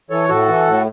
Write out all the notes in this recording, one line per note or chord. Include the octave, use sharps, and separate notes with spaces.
E3 A4 C#5
A2 F#4 A4
E3
A2